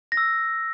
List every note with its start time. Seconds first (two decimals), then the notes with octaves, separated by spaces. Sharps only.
0.12 A#6
0.17 E6